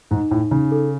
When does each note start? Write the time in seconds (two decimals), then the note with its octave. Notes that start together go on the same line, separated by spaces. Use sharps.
0.11 G#2 D#4
0.31 A2 D#4
0.51 C#3 D#4
0.72 A4